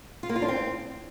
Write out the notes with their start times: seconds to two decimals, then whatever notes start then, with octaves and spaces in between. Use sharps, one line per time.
0.23 F4
0.29 A#3
0.36 F4
0.42 D4
0.48 C4